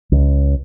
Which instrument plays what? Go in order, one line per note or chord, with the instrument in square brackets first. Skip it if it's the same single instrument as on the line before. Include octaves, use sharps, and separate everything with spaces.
[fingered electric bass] C#2